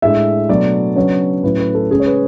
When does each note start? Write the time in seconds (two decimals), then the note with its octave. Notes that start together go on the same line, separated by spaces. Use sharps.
0.02 A2 G#3 D4 E5
0.49 B2 F#3 A3 D4 D5
0.96 C#3 F#3 B3 D4 C#5
1.43 A2 F#3 A3 C#4 B4
1.59 B4
1.75 A4
1.91 C#3 G#3 C#4 G#4
2.00 C#5
2.06 B4